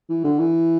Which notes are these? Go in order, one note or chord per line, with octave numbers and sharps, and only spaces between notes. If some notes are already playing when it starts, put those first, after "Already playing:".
E3
D3
E3